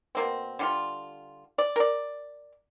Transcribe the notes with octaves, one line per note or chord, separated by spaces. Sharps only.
B2 A#3 C4
D3 G3 F4
D5
A#4 D5